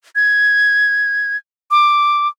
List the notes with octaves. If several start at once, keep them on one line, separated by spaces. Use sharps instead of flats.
G#6
D6